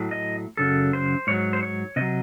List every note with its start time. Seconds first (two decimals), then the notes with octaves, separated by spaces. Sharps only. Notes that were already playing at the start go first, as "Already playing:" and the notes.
Already playing: A2 F#3
0.11 D#5
0.57 F#2 C#3 F#3 A4
0.93 C5
1.27 G#2 F#3 C#5
1.53 C5
1.63 C#5
1.96 C3 F#3 D#5